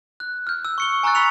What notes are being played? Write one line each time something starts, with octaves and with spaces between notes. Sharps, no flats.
F#6
F6 G6
E6
C#6 C#7 G7
G#5 A#5 C#6 E6 F#6 A6
B5 E6 B6 C#7 F7